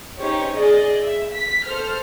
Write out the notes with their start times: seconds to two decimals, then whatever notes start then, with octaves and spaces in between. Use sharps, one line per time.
0.18 C#4 D#4 G4 C5 C#5
0.55 G#4 D5 D#5
1.02 E5
1.33 B6
1.67 A4 C5 F6